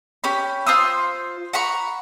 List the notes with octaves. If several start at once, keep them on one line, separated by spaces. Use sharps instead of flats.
C#4 G4 B5
F4 C5 D#6 E6
F#5 A#5 B5 C#6